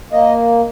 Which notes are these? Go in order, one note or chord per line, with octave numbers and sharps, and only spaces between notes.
A#3 D#5